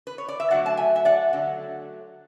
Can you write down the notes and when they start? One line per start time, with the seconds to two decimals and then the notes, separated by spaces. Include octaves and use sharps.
0.07 B4
0.18 C#5
0.28 D5
0.40 E5
0.50 D3 F#3 A3 D5 F#5
0.66 A5
0.77 E5 G#5
0.96 E5
1.05 D5 F#5
1.33 D3 F#3 A3